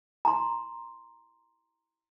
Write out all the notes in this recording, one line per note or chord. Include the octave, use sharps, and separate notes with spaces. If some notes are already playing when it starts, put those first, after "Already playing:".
A#5 C6